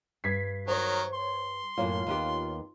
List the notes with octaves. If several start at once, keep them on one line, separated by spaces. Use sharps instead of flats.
G2 G#6 B6 C7
D#3 F#3 A#4 C5 C#5
C6
F#2 A2 A#3 F4 C#5
D#2 B3 G4